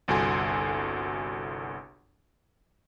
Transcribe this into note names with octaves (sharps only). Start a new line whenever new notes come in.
G1 C2 F#4 A4 G#5 C6